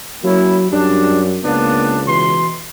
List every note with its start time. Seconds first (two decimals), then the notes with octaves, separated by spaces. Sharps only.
0.24 F#3 A#3 C#4 E4
0.72 F#2 G3 D4
1.44 C#2 A#3 B3 D4
2.05 B2 E3 C6